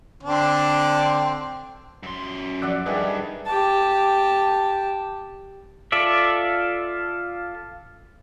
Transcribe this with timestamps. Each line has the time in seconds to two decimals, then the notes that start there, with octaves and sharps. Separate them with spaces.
0.23 D3 C4 D4
2.03 F#2 C6
2.62 F3 D5 F#5 E6 F#6
2.86 G2 D#3 G#4 B4 E5 G#5
3.46 G4 A5
5.92 F4 A4 D5 E5